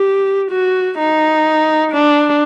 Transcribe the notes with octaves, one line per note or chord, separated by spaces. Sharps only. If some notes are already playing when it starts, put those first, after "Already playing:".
Already playing: G4
F#4
D#4
D4